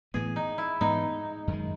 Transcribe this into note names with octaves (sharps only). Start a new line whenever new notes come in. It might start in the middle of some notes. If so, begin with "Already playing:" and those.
A2 E3 B3 G#4
D#4
E4
G#2 E3 B3 D#4
F#2 D#3 G#3